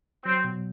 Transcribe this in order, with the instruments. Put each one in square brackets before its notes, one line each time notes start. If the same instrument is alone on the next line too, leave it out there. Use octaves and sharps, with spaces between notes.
[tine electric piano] F#3 [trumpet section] C4
[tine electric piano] B2